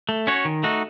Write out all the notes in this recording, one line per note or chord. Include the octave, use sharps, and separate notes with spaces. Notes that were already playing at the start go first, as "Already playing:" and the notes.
A3
C#4 F#4 C#5
D#3
A3 D#4 F#4